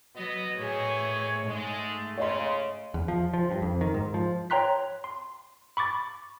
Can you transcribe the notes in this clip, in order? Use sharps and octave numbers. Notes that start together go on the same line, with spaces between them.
F#3 B3 D#5
A2 D#3 E3 G#4 C#5
G#2 G#3 A3
C#3 C#5 D#5 C6
E2
F3
F3
G2
F2
D#3
G#2
F3
C#5 G5 A#5 C6 F#6 B6
C6
B5 C#6 D6 A6